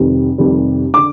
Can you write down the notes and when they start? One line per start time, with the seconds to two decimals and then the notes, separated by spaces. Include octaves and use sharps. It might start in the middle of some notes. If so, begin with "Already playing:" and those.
Already playing: F1 F2 C3 D#3 G3
0.38 F1 F2 C3 D#3 G3
0.94 D3 D6